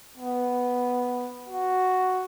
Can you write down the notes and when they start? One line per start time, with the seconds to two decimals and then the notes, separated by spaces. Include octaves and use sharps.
0.17 B3
1.49 F#4